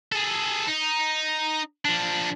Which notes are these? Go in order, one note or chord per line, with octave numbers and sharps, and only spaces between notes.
G#4 A4
D#4
F3 D4